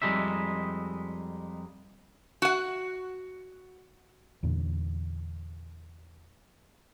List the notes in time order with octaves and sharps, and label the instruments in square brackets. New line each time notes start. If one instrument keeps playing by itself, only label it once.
[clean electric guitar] F2 B2 G3 G#3 D#4 E5
[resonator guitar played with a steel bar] F#4 F#5
[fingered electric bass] E2 A#2 D3